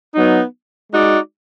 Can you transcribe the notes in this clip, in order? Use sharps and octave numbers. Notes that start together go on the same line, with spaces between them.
F#3 B3 D#4
G#3 D#4 F#4 D5